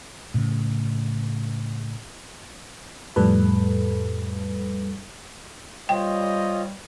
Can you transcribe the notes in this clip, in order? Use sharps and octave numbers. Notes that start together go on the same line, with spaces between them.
A2 C#3
F2 A2 G3 A4 B4
G3 F4 C5 C#5 D#5 G5